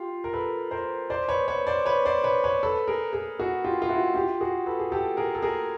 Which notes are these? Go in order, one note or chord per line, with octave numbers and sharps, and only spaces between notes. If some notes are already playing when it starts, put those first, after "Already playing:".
Already playing: F4 G4
A#4
A4 B4
A#4 C5
C5 D5
B4 C#5
B4 C#5
C5 D5
B4 C#5
C5 D5
B4 C#5
B4 C#5
A4 B4
G#4 A#4
G#4 A#4
F#4 G#4
F4 G4
F4
E4 F#4
F4 G4
F#4 G#4
A4 B4
G#4
G4 A4
G#4 A#4
A4
G#4 A#4